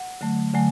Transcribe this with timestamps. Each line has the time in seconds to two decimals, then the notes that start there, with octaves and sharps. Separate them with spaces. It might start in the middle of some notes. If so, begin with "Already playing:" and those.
Already playing: F#5
0.21 D3 F#3 A3
0.54 D3 F#3 A3 G#5